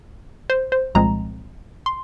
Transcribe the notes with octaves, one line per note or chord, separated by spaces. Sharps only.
C5
C5
C2 A#2 F3 G#3 C4 A#5
C6